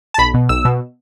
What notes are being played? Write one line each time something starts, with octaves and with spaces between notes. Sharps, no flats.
A5
B1 B5
B2
B1 E6
B2